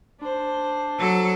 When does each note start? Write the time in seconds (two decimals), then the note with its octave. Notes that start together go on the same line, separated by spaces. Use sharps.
0.21 D4 C5
0.98 F#3 A4